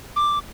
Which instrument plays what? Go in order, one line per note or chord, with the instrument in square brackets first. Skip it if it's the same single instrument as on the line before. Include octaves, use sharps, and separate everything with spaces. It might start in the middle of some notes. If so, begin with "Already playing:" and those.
[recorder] D6